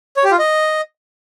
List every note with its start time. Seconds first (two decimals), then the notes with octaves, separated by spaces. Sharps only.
0.17 C#5
0.24 G4
0.31 F4
0.39 D#5